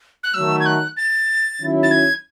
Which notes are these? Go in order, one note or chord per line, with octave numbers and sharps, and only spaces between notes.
F#6
D#3 F#3 A3 E6
G#6
F#6
A6
D#3 F#3 C#4 E4
A6
G#6